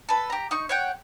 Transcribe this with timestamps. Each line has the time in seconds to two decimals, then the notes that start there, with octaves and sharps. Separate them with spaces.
0.09 A4 B4
0.30 G4 A#5
0.51 D#4 C#6
0.69 C#5 F#5 G5